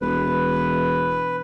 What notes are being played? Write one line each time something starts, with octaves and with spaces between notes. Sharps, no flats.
E1 B4